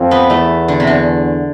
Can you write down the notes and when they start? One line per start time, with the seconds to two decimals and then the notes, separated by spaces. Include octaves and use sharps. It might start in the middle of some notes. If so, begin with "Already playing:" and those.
Already playing: F2 A3
0.11 B3
0.29 E2 A3
0.68 D3
0.80 C3
0.87 D3